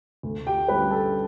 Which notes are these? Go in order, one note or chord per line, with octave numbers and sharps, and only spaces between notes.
D2
G4 G5
D3 G3 C#4 B4 B5
A4 A5